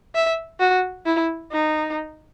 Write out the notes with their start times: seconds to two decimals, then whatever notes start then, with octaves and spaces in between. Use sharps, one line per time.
0.15 E5
0.60 F#4
1.06 E4
1.52 D#4